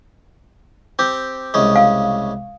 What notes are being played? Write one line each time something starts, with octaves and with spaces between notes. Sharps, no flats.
C4 G4
C2 C#3 G#3
F5